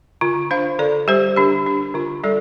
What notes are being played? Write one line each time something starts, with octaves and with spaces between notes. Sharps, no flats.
D3 F4
D4 C5 F5
D3 A4 D5
G3 G4 C5
D3 D4 G4
D4
D3 F4
G3 A4 D5